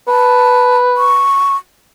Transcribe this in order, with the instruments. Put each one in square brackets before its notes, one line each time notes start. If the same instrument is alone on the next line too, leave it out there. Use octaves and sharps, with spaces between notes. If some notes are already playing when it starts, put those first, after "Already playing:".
[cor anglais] B4 [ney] A5
[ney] C#6